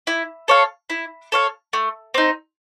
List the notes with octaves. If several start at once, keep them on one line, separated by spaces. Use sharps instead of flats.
E4
A4 C#5 F5
E4
A4 C#5 F5
A3
C4 D#4